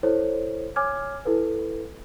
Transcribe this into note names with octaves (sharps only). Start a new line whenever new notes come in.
E4 A4 C5 C#5
C#5 G#5 D6 F6 G#6
E4 A4 B4